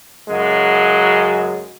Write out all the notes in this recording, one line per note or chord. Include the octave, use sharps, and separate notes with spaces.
F#2 C#3 F#3 G#3